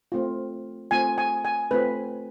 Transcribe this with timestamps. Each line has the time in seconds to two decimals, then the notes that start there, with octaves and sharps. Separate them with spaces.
0.12 A3 C4 F4
0.91 A3 C4 F4 G#5
1.18 G#5
1.45 G#5
1.71 A3 C4 F4 B4